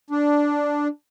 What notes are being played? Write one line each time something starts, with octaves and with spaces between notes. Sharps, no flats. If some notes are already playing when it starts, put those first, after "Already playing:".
D4